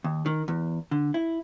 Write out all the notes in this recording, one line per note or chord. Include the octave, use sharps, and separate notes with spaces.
D#2
D#3
E2
D3
E4